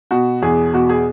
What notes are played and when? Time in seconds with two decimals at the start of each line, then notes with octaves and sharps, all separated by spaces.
0.11 B2 F#4
0.42 E2 G#4
0.73 B2 F#4
0.89 G#4